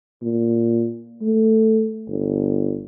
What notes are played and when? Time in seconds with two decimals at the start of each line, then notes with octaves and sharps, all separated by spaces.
0.23 A#2
1.22 A3
2.08 G1